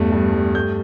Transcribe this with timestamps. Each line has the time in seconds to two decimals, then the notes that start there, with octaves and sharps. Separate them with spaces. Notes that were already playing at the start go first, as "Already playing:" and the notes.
Already playing: E2 G2 A3
0.12 G2
0.33 G2
0.55 A3 G6